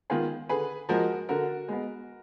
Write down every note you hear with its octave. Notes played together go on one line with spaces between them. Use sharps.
D#3 G#3 B3 F4 G#4
D3 G#4 B4
F3 G#3 F#4 A#4
D3 F#4 A#4
G#3 B3